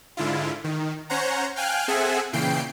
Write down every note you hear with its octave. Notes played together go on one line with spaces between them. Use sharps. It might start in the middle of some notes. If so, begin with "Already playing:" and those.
G#2 D3 E4 F4
D#3
C#4 C5 C#5 F#5 A#5
F5 G5 G#5 F6 F#6
C4 G#4 A4 E5 F#5 G#5
A#2 C#3 E3 G5 C7 D7